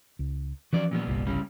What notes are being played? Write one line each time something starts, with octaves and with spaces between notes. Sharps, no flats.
C#2
E3 F3 C#4 F#4 B4 D5
A#2 G3 B3
G1 C2
C#3 G3 C#4